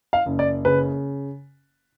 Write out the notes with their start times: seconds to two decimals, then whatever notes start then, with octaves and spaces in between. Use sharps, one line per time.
0.13 F5
0.26 F#1
0.39 D5
0.65 C#3 B4